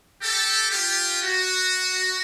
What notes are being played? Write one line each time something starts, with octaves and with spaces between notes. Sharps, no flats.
G4 A4
F4 G4
F#4